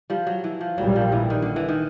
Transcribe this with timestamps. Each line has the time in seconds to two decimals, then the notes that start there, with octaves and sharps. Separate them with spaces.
0.10 F3 G3
0.27 F#3
0.44 E3
0.61 F3
0.78 A#1 A#2 F#3 G3
0.96 F3
1.12 E3
1.30 D#3
1.42 D3
1.56 E3
1.69 D#3